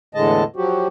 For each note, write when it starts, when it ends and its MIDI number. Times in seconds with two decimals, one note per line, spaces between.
0.15 0.44 40
0.15 0.44 45
0.15 0.44 50
0.15 0.44 56
0.15 0.44 75
0.15 0.44 81
0.56 0.88 53
0.56 0.88 54
0.56 0.88 66
0.56 0.88 67